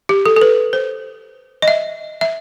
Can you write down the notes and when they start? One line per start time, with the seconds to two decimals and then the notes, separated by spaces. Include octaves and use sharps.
0.09 G4
0.26 A4
0.36 A4
0.41 B4
0.73 C5
1.62 D#5
1.68 E5
2.21 E5